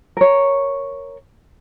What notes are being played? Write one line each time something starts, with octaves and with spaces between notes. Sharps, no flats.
A#4 C#5